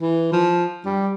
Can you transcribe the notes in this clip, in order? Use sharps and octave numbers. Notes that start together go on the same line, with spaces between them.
E3
F3
G3